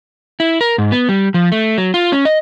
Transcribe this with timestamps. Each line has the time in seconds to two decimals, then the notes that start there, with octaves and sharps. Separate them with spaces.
0.40 E4
0.61 A#4
0.78 G#2
0.92 B3
1.09 G3
1.34 F3
1.52 A3
1.78 F#3
1.94 F4
2.12 C#4
2.25 D#5